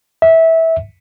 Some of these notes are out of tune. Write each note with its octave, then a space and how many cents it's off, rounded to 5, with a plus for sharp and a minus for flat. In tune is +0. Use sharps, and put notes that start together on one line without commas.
E5 -15